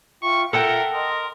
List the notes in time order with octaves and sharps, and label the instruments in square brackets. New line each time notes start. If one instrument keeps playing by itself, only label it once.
[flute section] F4 E5 G5 [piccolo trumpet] C#6
[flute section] F4 E5 [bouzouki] A4 F#5 G5 [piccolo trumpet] A#4
[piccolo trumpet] A#4 [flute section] D#5 C6 D#6